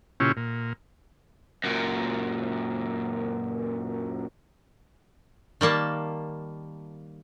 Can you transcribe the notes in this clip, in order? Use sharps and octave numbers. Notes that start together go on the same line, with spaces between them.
A#2 C#3 C#4 E4 F4 G4
A#2
F#2 A#2
D#3 G3 A#3 A5